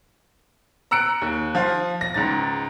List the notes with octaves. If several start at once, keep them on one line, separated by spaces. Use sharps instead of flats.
A#5 E6 F#6 C#7 D7
D#2
F3 F4
A#6
C#2 G#2 A6